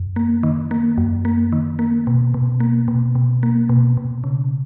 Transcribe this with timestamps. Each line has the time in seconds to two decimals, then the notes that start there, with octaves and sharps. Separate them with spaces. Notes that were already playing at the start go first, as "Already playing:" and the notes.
Already playing: F#2
0.16 A#3
0.43 D#3
0.71 A#3
0.98 F#2
1.25 A#3
1.52 D#3
1.79 A#3
2.07 B2
2.34 B2
2.60 A#3
2.88 B2
3.15 B2
3.43 A#3
3.69 B2
3.97 B2
4.24 C#3